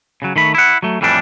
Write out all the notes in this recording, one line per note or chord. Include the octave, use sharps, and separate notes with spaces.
C#3 F#3
D#3 A3 B5
E4 F#5
F#3 A3
F2 A2 E3 G3 D4